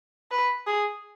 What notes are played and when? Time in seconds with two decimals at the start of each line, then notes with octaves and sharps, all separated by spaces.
0.31 B4
0.66 G#4